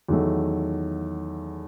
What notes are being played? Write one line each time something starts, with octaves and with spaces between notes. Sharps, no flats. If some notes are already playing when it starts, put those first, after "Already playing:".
E2 D#3 F#3 A3